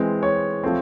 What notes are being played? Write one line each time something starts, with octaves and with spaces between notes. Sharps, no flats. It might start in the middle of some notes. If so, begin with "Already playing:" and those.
Already playing: E3 G#3 C4
C#5
F3 A3 C4